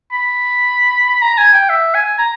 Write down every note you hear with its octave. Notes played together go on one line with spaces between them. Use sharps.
B5
A#5
G#5
G5
E5
G#5
A#5